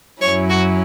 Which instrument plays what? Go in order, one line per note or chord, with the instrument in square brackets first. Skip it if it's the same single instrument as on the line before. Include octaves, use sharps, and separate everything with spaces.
[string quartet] F#2 F#3 C#4 E4 [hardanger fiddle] C#5
[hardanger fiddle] F#4